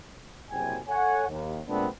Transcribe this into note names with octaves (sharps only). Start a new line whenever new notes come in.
F#1 C2 G5 G#5
A4 C#5 F#5 G#5
D#2
A#2 G#3 A3 B3 C4 D4